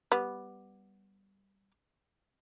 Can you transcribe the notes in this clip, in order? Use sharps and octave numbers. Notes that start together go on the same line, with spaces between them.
G3 B3